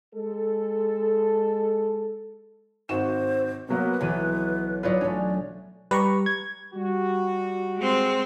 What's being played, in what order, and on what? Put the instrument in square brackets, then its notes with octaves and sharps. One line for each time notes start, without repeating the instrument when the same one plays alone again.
[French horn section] G#3 A4
[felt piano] G#1 F#4 E7 [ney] C5
[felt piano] B2 F#3 A#3 [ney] B4
[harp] B1 E3 D#7 [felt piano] F#3
[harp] F#3 D#4 F4 [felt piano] B4 C#5 D5
[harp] A3 C#4 [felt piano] D4 [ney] D5
[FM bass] G3 [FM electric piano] B4 A#5 C#6
[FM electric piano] G#6
[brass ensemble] G3 F#4
[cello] G#3 C4